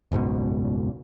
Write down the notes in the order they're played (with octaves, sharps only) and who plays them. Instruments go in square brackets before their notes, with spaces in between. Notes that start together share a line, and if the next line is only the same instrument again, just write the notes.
[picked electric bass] F#1 C#2 G#2 B2